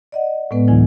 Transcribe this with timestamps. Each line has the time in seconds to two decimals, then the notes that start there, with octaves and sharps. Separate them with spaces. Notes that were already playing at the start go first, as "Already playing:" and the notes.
0.12 D5 D#5 F#5
0.51 A2 G#3 B3 B4
0.68 D2 D3 E3 F#3 E4 G#5